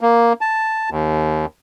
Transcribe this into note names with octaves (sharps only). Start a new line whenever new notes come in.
A#3
A5
D#2